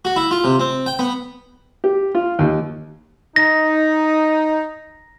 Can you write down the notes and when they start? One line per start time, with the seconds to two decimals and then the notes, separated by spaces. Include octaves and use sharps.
0.05 F#4
0.16 E4
0.31 F4
0.44 C3
0.60 C4
0.86 G5
0.99 B3
1.84 G4
2.15 F4
2.39 D#2
3.36 D#4 A#6